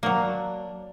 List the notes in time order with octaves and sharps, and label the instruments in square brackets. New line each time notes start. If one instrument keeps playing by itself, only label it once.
[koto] F#3 A#3 [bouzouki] D4